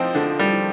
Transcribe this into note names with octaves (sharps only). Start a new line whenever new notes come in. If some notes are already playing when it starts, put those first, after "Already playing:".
Already playing: F3 C4 D#4
D3
G3